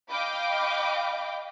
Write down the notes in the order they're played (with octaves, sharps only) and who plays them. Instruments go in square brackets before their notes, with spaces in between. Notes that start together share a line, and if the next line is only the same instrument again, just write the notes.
[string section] D#5 F5 G5 B5 D6